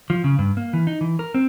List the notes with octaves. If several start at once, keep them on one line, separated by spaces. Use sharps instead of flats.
F3
C#3
G2
A#3
E3
D#4
E3
A#4
C4